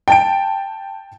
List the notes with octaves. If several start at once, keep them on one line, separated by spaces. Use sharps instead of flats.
G5 A5 D7